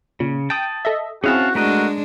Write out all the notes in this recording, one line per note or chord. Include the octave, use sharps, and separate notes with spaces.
A#2 C#3
G5 A5 D#6
A4 D#5 E5
C4 C#4 E4 F#4 G#4 F5 A5
G#3 A3 D4 F#4 A#4 D#5